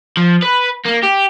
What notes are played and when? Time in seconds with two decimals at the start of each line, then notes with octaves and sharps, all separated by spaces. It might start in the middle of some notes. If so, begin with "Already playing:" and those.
0.17 F3
0.42 B4
0.85 A#3
1.03 G4